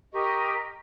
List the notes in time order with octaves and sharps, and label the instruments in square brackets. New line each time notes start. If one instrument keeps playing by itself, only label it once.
[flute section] G4 A#4 D#5 C#6